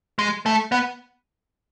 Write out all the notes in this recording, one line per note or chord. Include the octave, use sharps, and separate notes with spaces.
G#3
A3
B3